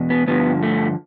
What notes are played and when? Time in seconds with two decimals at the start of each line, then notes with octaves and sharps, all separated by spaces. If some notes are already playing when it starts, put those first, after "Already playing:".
Already playing: E2 B2
0.10 B3
0.28 G2 D3 F3 B3
0.63 A3